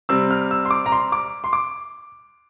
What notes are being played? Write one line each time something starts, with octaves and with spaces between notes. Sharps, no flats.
C3 G3 C4 E6
F6
E6
C6
D6
A#5
C6
D6
C6
D6